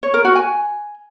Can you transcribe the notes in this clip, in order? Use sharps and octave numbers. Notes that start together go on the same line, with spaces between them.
C#5
A#4
F#4
G#5